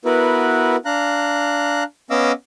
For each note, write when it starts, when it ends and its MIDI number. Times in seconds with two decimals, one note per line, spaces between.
0.05 0.76 59
0.05 0.76 64
0.05 0.76 66
0.05 0.76 70
0.05 0.76 71
0.85 1.83 62
0.85 1.83 77
0.85 1.83 82
0.85 1.83 90
2.11 2.32 59
2.11 2.32 61
2.11 2.32 75
2.11 2.32 77
2.11 2.32 86
2.11 2.32 88